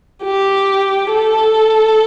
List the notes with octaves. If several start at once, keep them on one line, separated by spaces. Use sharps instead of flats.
G4
A4